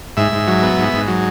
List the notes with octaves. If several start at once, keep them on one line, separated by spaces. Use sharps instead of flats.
G#2 E5
G#2
F#3
B3
G#2
G#2
F#3